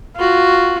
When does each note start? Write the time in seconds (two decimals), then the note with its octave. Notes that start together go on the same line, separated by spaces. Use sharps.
0.16 F4 F#4